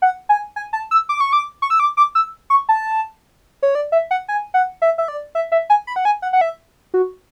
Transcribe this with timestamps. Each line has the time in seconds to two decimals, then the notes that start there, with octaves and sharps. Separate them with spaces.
0.02 F#5
0.29 G#5
0.56 G#5
0.73 A5
0.91 E6
1.09 D6
1.20 C#6
1.33 D6
1.62 C#6
1.70 E6
1.80 D6
1.97 D6
2.15 E6
2.50 C#6
2.69 A5
3.63 C#5
3.75 D5
3.92 E5
4.11 F#5
4.28 G#5
4.54 F#5
4.82 E5
4.98 E5
5.08 D5
5.35 E5
5.52 E5
5.70 G#5
5.87 B5
5.96 F#5
6.05 G#5
6.22 F#5
6.33 F#5
6.41 E5
6.94 F#4